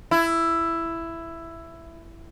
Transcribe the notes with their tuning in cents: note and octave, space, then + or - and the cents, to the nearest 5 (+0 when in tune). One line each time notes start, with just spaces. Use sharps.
E4 +10